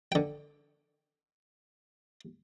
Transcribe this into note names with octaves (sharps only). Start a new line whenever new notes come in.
D3 G5